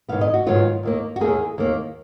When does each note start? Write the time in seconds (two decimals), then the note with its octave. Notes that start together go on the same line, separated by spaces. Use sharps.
0.09 G#2 D#3 F#3 B3 F5
0.21 D#5
0.34 F#4
0.46 G#2 D#3 F#3 B3 F4
0.83 D#2 D#3 A#3
1.16 F#4
1.21 D#2 D#3 A#3 G#4
1.58 D#2 D#3 A#3